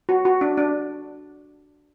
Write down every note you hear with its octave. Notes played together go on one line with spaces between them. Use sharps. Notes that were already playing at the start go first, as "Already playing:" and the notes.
F#4
F#4
D4
D4